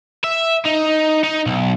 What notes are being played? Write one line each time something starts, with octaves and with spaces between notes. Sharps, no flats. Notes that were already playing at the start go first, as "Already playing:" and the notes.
E5
D#4
D#4
B1